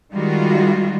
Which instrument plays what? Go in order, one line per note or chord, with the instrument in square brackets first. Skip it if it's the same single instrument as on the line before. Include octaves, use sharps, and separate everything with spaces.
[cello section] D#3 G3 G#3 F4 F#4